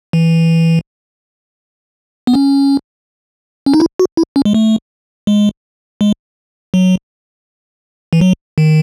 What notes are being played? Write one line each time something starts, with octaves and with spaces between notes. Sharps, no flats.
E3
B3
C#4
C#4
D#4
E4
F#4
E4
C#4
G#3
A3
G#3
G#3
F#3
E3
F#3
D#3